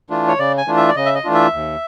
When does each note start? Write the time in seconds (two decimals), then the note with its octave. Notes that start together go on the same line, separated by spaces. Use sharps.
0.10 E3 A3 D4 F4
0.28 C#5
0.39 C#3 D5
0.58 G#5
0.67 E3 A3 D4 F4
0.77 E5
0.89 D5
0.96 C#3 D#5
1.06 E5
1.14 D#5
1.24 E3 A3 D4 F4
1.34 E5
1.53 D#2